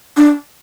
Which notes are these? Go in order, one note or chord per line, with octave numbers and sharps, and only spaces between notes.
D4